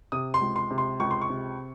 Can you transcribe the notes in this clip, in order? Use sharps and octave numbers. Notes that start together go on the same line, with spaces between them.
C3 D#6
C6
C#2
C6
C3
C6
C#2 C#6
C6
C#6
C3